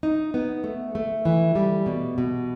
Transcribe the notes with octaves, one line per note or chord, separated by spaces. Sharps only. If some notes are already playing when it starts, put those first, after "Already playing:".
D#4
B3
A3
A3
E3
G3
B2
B2